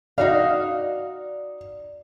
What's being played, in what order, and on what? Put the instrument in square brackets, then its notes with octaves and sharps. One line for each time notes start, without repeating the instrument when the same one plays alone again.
[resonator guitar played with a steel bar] D#4 F#4 F5 [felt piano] D5